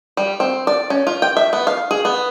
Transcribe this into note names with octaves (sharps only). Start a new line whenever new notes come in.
G3
C4
D5
C#4
F4
G5
E5
B3
F5
G#4
B3